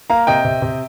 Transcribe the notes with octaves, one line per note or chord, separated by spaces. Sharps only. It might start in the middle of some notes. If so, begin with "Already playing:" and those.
A#3 F5 A#5
C3 D#5 G5
C3
C3